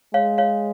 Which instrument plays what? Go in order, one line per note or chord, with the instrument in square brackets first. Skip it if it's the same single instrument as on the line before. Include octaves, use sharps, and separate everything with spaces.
[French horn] G#3 [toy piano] C#5 F5
[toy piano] C#5 F5